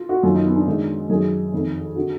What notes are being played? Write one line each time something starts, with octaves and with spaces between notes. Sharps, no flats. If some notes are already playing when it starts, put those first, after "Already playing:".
Already playing: F4
F#4
F#2 D#3 F4
D#4
B3
D4
G#2 D#3
F#2 D#3 G#4
F2 D#3
D3 F#4